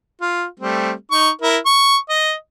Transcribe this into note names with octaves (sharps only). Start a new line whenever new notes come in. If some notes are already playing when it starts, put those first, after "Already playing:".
F4
G3 A3 C4
D#4 C#6
E4 A#4
C#6
D#5